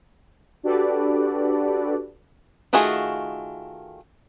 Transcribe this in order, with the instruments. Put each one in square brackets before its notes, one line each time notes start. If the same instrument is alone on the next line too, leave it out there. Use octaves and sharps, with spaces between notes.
[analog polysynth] D4 F#4 G4 A4 B4 D5
[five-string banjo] D#3 A3 F4 F#4 G#4